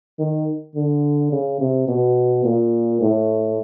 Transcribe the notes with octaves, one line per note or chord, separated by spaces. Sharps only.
D#3
D3
C#3
C3
B2
A#2
A2